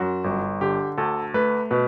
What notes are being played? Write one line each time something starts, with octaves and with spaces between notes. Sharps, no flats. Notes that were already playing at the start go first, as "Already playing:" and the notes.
Already playing: F#2 F#4
G1
D3 G4
D2 A4
A3 B4
B2 B4